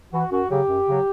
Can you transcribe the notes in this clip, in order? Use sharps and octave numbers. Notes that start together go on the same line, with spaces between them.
E3 F#4
F#2 F#4
C#3 F#3 G4
F#2
C#3 F#3